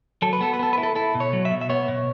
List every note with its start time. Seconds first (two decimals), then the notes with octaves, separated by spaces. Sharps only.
0.22 F#3 A4
0.33 B4
0.41 B3 A4
0.53 B4
0.59 B3 A4
0.73 B4
0.78 E4
0.83 A4
0.95 E4 A4
1.14 B2
1.20 C#5
1.33 F#3
1.45 E5
1.51 B2
1.61 E5
1.70 B3 C#5
1.88 B2